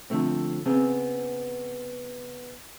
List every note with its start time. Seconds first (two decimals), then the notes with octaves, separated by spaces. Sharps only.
0.10 D3 F3 A3 C4
0.66 C#3 B3 C4 G#4